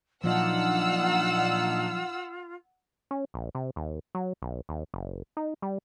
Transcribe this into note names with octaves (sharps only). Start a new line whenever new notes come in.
A#2 F3 F#3 D4 D#4 F4 F#5 E6
C#4
A#1
C3
D#2
F#3
B1
D#2
F#1
D#4
G3